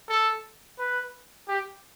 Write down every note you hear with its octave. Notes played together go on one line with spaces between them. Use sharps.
A4
B4
G4